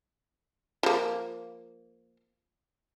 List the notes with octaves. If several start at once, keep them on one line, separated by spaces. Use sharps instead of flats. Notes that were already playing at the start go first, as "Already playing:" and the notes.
F3 A#3